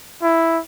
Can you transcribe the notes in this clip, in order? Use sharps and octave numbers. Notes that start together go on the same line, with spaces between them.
E4